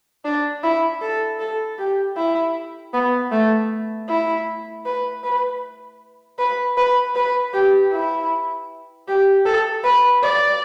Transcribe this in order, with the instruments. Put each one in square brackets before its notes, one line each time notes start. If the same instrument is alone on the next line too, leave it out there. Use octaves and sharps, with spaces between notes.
[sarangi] D4
E4
A4
A4
G4
E4
B3
A3
E4
B4
B4
B4
B4
B4
G4
E4
G4
A4
B4
D5